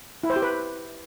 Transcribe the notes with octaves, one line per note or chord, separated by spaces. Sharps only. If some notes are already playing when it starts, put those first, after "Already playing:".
E4
C5
G4
B4